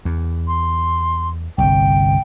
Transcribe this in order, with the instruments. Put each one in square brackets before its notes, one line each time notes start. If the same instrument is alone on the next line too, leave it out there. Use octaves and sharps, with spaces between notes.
[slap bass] E2
[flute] C6
[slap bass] G1 C2 [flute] G5